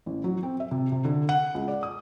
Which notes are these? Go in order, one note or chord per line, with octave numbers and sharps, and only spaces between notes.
A1
F#3
C4
E5
C3
C3
D3
F#5
C#2
D5
D#6